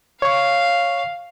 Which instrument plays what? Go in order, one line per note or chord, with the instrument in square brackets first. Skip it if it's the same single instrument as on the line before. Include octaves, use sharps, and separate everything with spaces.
[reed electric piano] C#5 C#6 [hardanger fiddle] F5